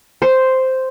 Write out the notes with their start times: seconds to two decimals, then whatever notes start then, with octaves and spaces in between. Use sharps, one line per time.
0.22 C5